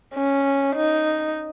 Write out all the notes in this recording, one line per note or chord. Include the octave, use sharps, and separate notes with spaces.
C#4
D#4